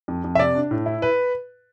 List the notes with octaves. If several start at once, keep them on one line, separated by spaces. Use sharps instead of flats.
F2
F2
E5
C3 D5
D4
A2
E4
B4